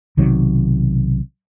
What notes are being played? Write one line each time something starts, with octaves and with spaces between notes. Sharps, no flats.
B1 C3 D#3 F#3